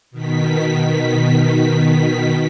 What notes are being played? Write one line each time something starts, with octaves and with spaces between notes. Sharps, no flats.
B2 D#3 B6